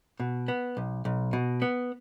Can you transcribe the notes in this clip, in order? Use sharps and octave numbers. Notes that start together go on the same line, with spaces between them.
B2
B3
B1
B1
B2
B3